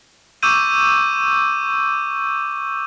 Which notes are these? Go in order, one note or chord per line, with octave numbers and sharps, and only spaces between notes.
C#6 D6 E6 G6 D#7